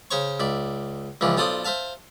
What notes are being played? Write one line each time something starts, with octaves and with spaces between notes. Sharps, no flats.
C#3 C5 C#5 C#6
C#2 D5 E5
C#2 E3 F3 D5
B1 F4 A4 C5 D5 D#6
C5 E5 F5 A5